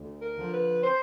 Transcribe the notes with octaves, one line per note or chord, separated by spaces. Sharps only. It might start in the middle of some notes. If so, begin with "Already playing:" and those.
Already playing: D2
A#4
D3 F3
B4
C5